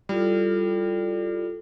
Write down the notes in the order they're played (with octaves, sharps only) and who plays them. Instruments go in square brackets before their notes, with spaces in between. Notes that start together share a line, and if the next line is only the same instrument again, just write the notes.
[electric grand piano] G3 [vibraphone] E4 F4 A4